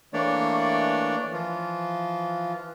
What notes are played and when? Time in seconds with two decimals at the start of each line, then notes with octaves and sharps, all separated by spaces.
0.13 E3 A3 A#3 D4 C#5 D5
1.33 E3 F3 F4